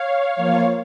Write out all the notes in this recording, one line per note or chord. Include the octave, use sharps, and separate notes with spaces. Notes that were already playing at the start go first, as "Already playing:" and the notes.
Already playing: C#5 F5
F3 A#3 F4